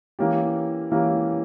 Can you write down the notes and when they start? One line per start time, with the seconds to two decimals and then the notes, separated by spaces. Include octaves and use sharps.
0.19 E3 A#3 C#4 G4
0.91 E3 A#3 C#4 G4